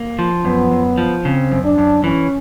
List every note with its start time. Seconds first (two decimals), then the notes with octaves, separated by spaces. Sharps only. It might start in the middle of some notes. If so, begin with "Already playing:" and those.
Already playing: A#3
0.19 F3
0.45 F#2 B3
0.72 F#2
0.98 F3
1.25 C#3 C4
1.52 F#2
1.64 D4
1.78 F#2
2.04 E3 C#4